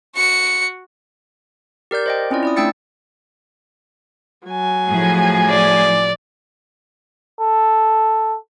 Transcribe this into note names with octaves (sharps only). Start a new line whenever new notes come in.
F#4 C#7
G4 A#4 D5 G6
C5 D#5 G5
C4 C#4 E4 F4 D5
E4 D5 D#6
A3 D4 G5 E6 A6 C#7
F#3 G#5
A2 F3 G#4
D5
A4